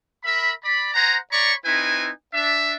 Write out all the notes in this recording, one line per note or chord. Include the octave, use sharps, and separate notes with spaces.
A#4 E5 B5
D5 B5
C5 F#5 G#5 A#5
C#5 D5 A#5 B5 C#6
C4 D#4 E4 B4 G#5
D4 E5